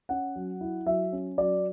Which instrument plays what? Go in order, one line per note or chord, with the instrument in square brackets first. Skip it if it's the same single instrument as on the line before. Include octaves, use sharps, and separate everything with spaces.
[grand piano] C#4 F#5
F#3
E4
F#3 E5
C#4
F#3 D5